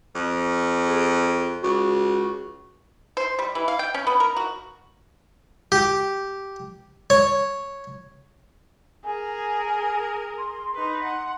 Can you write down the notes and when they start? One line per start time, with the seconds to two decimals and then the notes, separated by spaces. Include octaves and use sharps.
0.15 F2
0.86 G#4
1.63 C#2 F#4
3.17 C5
3.39 G3
3.55 E3
3.68 F5
3.79 G5
3.94 C#4
4.07 B3
4.20 A#4
4.37 F#4
5.72 G4
7.10 C#5
9.04 G#4 A#4 G#5
10.38 C6
10.75 D#4 B4 C6
11.03 F#5